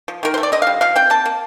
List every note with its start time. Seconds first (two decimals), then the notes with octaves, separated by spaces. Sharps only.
0.08 F3
0.23 D#3 A#4
0.34 C5
0.38 A3
0.43 D5
0.52 D3 D#5
0.62 F5
0.67 G3
0.81 F3 F5
0.96 C4 G5
1.10 A#3 A5
1.26 A#3